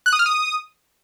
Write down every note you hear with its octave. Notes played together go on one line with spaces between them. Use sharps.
F#6
D#6
F6
D#6